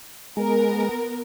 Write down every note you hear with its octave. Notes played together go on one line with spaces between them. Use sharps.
G#3 B3 A#4